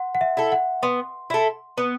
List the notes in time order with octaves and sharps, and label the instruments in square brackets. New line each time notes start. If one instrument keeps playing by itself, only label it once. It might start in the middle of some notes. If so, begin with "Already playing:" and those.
Already playing: [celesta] F#5 C6
F#5
E5
[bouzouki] E4 A4
[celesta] F#5
[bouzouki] B3 [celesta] C6
[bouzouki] E4 A4
B3